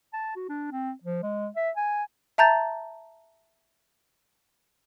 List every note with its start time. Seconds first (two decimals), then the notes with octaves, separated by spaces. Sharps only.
0.13 A5
0.36 F#4
0.49 D4
0.71 C4
1.04 F3
1.23 G#3
1.56 E5
1.76 G#5
2.38 E5 A5 A#5 G6 A6